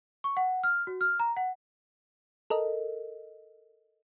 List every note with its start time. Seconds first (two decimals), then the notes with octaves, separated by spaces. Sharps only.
0.24 C#6
0.37 F#5
0.64 F6
0.87 F#4
1.01 F6
1.20 A#5
1.37 F#5
2.50 A4 A#4 D#5